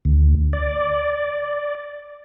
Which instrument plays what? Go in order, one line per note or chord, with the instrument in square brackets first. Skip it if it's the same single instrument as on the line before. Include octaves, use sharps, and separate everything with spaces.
[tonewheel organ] D2
D5